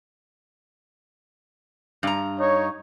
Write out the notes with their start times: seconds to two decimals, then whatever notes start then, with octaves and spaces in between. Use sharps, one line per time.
2.03 G2 A#5
2.39 D#4 C#5